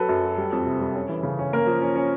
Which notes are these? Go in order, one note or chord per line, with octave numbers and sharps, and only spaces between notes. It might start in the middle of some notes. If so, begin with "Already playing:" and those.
Already playing: F#3 A4 B4
F#2
F#3
G3
F2
C3
G3
C#4
E3
C#3
C#4
A#3 A#4
F3
C#4
C#4